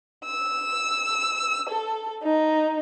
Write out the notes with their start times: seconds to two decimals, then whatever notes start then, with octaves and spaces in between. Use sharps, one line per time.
0.24 E6
1.69 A4
2.21 D#4